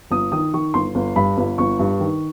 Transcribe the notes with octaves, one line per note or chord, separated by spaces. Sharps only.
G1 D#6
D#3 D#6
D#3 C#6
G1 C6
G1
G2 B5
G1
G1 C#6
G2
D#3